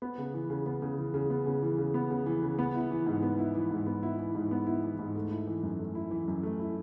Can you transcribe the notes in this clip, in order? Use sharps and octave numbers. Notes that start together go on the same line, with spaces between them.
B3
C#3
E3
C#3
B3
C#3
E3
C#3
B3
C#3
E3
C#3
B3
C#3
E3
C#3
B3
E4
E3
G#2
B3
E4
E3
G#2
B3
E4
E3
G#2
B3
E4
E3
G#2
A3
E4
E3
F#2
A3
E4
E3
F#2
A3
E4